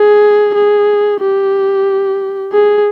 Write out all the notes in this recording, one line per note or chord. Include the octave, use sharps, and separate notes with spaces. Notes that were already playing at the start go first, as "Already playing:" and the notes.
Already playing: G#4
G#4
G4
G#4